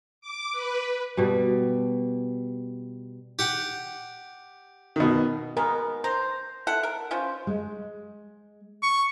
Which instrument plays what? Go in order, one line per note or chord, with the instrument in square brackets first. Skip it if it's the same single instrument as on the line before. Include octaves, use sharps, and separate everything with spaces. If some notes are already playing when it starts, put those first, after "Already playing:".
[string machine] D6
B4
[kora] B2 G3
[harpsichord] G4 F#5
[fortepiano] B2 D#3
[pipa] B2 G#3 B3 [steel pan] A#4
[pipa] C5 [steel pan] A#5
[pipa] E4 A4 F#5
A#4
C#4 F4 C5
[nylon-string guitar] G#3
[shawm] C#6